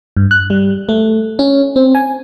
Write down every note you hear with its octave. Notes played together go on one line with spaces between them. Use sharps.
G2
F#6
G3
A3
C#4
C4
G#5